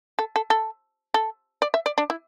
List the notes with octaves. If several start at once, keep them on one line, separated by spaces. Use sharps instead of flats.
A4
A4
A4
A4
D5
E5
D5
D4
E4